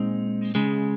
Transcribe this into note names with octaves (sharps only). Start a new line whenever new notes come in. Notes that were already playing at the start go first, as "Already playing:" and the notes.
Already playing: A#2 G#3 C4 D#4
C#2 C#3 G#3